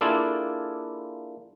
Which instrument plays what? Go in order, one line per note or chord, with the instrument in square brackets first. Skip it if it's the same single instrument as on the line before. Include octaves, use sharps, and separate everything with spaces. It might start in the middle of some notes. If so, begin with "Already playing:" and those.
[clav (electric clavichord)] A#3 D4 E4 F4 G#4 A4